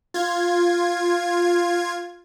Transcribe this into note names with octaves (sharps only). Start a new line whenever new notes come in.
F4 G#6